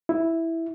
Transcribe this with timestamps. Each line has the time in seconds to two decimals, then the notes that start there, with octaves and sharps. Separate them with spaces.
0.09 E4